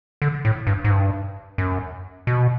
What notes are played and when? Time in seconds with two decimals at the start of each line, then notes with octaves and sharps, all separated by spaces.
0.22 D3
0.45 A2
0.67 G2
0.84 G#2
0.90 G2
1.58 F#2
2.27 B2